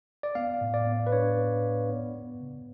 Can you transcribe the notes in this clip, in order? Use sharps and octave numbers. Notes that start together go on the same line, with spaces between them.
D5
B3 F5
A2
D5
B3
B4
D4 C#5
B3
B3
B3
B3
C#3